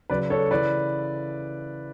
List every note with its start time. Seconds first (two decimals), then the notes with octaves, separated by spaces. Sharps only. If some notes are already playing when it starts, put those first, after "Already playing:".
0.10 C#3 F#3 B4 D5
0.30 A4 C#5
0.51 C#3 E3 B4 D5